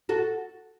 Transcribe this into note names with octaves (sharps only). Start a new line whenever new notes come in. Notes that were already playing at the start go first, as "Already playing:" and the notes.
F#4 A4